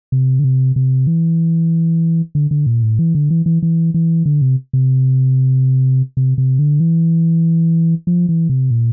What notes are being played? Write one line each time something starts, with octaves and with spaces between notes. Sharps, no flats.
C3
D3
C3
C3
E3
D3
D3
A#2
A2
E3
D3
E3
E3
E3
E3
D3
C3
C3
C3
C3
D3
E3
F3
E3
C3
A#2